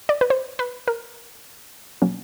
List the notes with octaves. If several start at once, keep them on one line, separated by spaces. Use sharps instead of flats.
D5
B4
C5
B4
A#4
B2 F#3 A#3 C#4